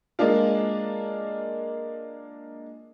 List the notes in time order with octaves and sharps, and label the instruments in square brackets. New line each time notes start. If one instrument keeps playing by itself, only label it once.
[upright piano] G#3 A#3 D4 F4